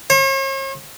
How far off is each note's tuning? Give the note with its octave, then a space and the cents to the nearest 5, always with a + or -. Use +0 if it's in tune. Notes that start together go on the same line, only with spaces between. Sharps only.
C#5 -45